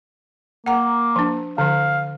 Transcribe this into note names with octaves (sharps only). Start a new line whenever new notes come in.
A#3 F#5 A#5
F3 D4
D3 F3 F5